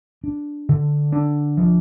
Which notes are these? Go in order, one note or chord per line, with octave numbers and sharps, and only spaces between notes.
D4
D3
D4
F3